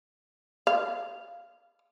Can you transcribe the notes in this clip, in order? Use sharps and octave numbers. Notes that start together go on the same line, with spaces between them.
F5